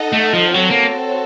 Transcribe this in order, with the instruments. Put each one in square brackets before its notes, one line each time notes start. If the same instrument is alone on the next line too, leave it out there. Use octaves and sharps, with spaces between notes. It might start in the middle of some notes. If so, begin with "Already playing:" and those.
Already playing: [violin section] D#4 A4 D#5 F#5
[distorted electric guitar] A3
F3
[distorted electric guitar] F#3 [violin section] C4 F#4 A4 C#5
[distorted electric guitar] A#3